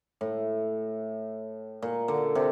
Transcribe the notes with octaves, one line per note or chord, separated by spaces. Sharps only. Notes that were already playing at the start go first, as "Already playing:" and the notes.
A2
A#2
D3
C3